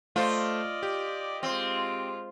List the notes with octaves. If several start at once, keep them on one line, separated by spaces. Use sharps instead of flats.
A3 F4 C5 D5 D#5
G4
G#3 C4 F4